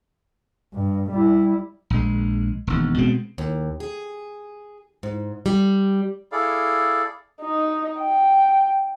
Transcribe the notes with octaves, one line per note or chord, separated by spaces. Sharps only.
G2
G3 E4
A#1 G#3
E1 D#2
B2 G#3 B3 C4
D#2
G#4
G#2
G3
E4 G#4 A4 D5 F5
D#4
G5